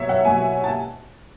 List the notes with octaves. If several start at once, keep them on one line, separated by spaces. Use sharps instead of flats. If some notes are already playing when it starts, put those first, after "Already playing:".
Already playing: B2 F#3 C#5 E5
F#5
B2 F#3 G#5
A5